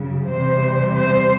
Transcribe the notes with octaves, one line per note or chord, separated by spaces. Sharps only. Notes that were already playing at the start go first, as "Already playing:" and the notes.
Already playing: F#2 C#3 F#3
E2 C3 E3 G3 C5
C5